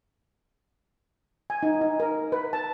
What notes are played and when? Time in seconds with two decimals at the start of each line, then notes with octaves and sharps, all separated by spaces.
1.50 G#5
1.63 D#4
1.81 D#4
2.00 A#4
2.32 B4
2.53 A5